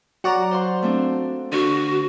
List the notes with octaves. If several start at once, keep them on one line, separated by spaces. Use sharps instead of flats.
F#3 F#4 D5 F#5 A#5
C5 F5 C6
A3 C4 D4
D3 F#4 F6